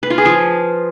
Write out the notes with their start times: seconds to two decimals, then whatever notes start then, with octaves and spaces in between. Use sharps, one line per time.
0.03 B4
0.10 F4
0.18 G#4
0.25 F3